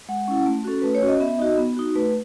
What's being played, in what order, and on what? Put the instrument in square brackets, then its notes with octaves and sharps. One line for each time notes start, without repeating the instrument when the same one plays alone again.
[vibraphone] G#3 F#5
C#4 E4
A3
C#4 F#4 A4
A3 B4
C#5
C#4 F#4
D#5
B3 E5
D#4 F#4 D#5
B3
D#4 F#4
A3 B4